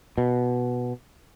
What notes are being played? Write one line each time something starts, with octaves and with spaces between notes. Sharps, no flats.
B2